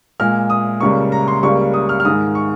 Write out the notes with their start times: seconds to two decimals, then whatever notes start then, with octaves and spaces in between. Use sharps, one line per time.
0.20 A#2 G#3 F6
0.50 D#6
0.80 C#2 C#3 G3 A#3 C#6
1.12 A#5
1.28 C6
1.43 C#2 C#3 G3 A#3 C#6
1.74 D#6
1.89 F6
2.00 F6
2.05 G#2 D#3 G#3 D#6
2.35 C#6